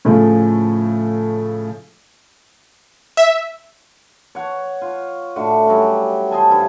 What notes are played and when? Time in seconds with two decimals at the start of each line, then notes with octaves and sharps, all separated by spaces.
0.05 A2 C#3 F3 A3
3.17 E5
4.35 C#5 F#5
4.82 F4
5.36 A2 D3 F#4
5.67 F#3 G3 C#4
6.31 C5 D#5 G#5 A5
6.50 G2 E4